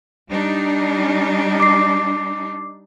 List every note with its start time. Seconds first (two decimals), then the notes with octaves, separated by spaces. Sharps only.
0.31 G3 D4 D#4
1.60 D6 C7